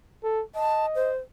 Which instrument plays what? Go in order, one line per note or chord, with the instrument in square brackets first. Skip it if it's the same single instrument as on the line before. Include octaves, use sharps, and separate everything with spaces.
[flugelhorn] A4
[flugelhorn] D#5 [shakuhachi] A5
[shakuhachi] C5